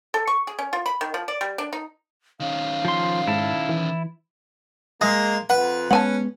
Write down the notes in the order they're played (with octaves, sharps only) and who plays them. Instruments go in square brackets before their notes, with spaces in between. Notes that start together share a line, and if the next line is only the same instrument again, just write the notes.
[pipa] A4
C#6
G#4
C#4
F4
B5
D#3
F3
D5
G3
D4
D#4
[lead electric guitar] D#3 C#4 [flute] F5
[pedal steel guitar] F3 C6
[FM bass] G#2 [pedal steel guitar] E4 A5
[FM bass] E3
[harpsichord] G#3 [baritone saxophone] A#3 [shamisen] G#4
[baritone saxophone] F2 [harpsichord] B4 [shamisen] F#5
[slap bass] G#3 A#3 B3 [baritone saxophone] C#4 [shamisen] F#5 G#5 A5